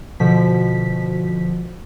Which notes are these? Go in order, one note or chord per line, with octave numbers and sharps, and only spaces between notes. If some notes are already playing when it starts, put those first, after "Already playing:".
B2 D3 F3 B6